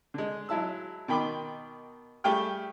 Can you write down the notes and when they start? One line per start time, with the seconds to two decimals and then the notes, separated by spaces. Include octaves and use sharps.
0.14 D3 G#3
0.49 F#3 G#3 E4 A5 E6
1.08 B2 D#3 G5 B5 C6 D6
2.24 G3 A3 G4 G#4 G5 F6